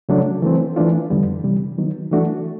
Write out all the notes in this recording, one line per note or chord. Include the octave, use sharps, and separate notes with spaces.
C#3 F#3 A3 D4
E3 A3 C4
E3 A3 D4 F4
F2 D3 G3 B3
C3 E3 G3
D#3 F#3 B3 D#4
E3 A3 D4 F#4